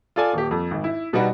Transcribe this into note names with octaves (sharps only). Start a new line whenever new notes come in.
F4 A4 D5 G#5
D#1 G4
F2
G#1
E4
B2 G3 B3 D#4 F#4